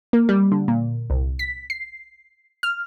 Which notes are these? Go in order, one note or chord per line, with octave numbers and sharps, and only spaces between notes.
A#3
G3
D3
A#2
C2
B6
C7
F6